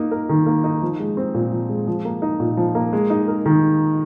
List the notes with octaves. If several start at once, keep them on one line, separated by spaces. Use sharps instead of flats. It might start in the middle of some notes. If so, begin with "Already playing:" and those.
Already playing: A#3 D#4
A#4
D#3
A#3
D#4
F3
G#3
C4
A#2
F3
G#3
F3
A#3
D#4
A#2
F3
A#3
G#3
D#4
A#4
D#3